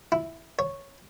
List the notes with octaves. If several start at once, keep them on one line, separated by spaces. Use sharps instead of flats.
E4
C#5